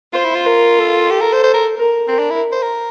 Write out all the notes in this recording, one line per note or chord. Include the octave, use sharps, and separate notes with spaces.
F4 C5
E4
F4
A#4
A4
G4
A#4
C5
C5
A#4
A#4
C4 A#4
D4
E4
C5
A#4